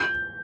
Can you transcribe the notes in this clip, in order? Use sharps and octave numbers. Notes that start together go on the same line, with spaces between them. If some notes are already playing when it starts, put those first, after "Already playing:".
Already playing: G6